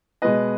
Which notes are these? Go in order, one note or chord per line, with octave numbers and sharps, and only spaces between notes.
B2 G#3 B3 B4 D#5